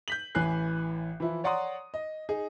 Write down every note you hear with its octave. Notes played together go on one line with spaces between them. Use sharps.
G6 B6 F#7
A1 E3 G#5 F#6 C7
E3 F3 E4
C#5 D5 F#5 A#5 C6 D#6
D#5
D#4 G#4